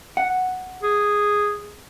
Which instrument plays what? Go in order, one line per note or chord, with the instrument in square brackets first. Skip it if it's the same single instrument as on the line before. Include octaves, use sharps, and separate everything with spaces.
[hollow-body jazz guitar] F#5
[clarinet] G#4